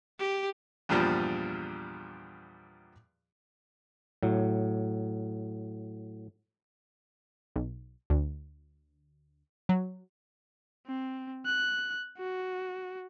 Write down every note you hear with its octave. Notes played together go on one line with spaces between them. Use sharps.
G4
E2 G2 A#2 F3 G3
A2 F#3
B1
D2
F#3
C4
F#6
F#4